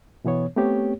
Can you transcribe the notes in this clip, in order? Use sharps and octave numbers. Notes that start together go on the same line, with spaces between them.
B2 E3 B3 C#5
A3 B3 C4 G4 C#5